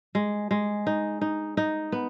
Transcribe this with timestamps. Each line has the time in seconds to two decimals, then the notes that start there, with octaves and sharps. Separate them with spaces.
0.15 G#3
0.51 G#3
0.87 D#4
1.21 D#4
1.57 D#4
1.92 B3